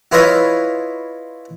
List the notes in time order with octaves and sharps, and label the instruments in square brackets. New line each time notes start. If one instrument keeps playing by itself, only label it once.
[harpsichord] E4 F4 B4 C#5 D#5 E5